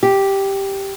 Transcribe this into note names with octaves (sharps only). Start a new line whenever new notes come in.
G4